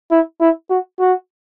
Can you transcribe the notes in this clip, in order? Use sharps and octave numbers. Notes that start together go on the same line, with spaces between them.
E4
E4
F#4
F#4